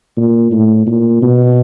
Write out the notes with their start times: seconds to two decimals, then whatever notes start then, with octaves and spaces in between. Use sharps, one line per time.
0.17 A#2
0.52 A2
0.87 A#2
1.22 B2